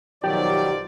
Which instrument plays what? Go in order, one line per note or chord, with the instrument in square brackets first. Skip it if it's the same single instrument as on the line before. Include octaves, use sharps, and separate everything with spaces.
[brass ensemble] B1 F3 D5 [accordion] D#3 F#3 [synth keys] G4